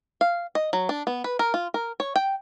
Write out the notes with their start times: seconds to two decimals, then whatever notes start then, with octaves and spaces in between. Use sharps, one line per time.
0.21 F5
0.55 D#5
0.73 F#3
0.89 D4
1.07 B3
1.24 B4
1.39 A#4
1.54 F4
1.74 A#4
2.00 C#5
2.16 G5